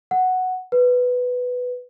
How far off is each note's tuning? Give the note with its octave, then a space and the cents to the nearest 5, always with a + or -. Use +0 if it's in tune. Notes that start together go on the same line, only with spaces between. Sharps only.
F#5 +0
B4 +5